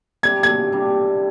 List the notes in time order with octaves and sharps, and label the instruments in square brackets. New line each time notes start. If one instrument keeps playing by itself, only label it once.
[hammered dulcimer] C3 G3 D4 [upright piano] G#6
[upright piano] G#6
[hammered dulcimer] C3 G3 D4